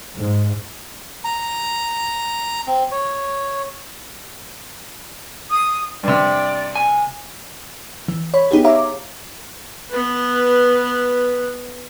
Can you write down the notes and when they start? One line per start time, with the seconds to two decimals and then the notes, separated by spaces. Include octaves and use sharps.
0.16 G#2
1.24 A#5
2.67 C4
2.91 C#5
5.50 D#6
6.03 G2 C3 D5
6.76 G#5
8.08 E3
8.34 C#5 B5
8.51 B3 D#4 G4 G#4
8.64 C#5 E5 F5 A#5 D6
9.91 B3 B4